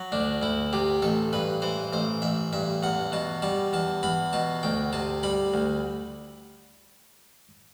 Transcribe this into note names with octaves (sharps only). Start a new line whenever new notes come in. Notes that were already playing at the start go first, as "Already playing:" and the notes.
Already playing: F#3
D2 D4
D2 E4
C3 G4
A1 A4
G2 B4
E3 C5
A1 C5
A1 E5
G2 E5
E2 F#5
B2 A5
G3 A5
E2 A5
E2 B5
B2 A5
D2 G5
C3 A5
G3 B5
D2